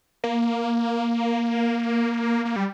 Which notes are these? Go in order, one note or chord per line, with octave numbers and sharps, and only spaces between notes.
A#3
A#3
G3